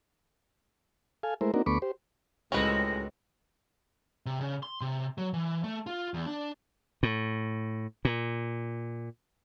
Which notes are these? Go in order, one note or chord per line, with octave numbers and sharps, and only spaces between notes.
A4 F5 G#5
G#3 A3 E4 A#4 C5
A#3 C4 D4 D#4 F#4 A#4
D2 A3 B3 B5 C#6 D6
G4 C5
C#2 A2 G#3 C4 C#4 F#4 A#4 B4
C3
C#3
C6
C3
F#3
E3
A3
F4
E2
D4
A2
A#2